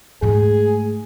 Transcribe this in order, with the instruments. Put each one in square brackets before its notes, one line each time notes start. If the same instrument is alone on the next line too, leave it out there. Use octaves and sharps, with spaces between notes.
[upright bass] G#2 A3 [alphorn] G#4